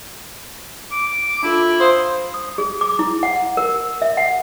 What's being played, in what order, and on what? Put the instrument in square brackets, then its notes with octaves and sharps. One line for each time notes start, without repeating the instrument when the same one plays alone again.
[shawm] D6
[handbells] D4 F4 A4 [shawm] E4
[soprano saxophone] C5 [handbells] F5 D#6
[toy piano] D#6
G#4
D6
E4
F#5
A#4
E5
F#5